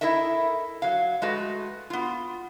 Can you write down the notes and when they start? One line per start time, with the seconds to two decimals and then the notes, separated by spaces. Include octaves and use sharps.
0.01 E4 A4 A#4 D#5 E5
0.82 F#3 F5
1.22 G#3 A3 F#4 B4
1.90 B3 F4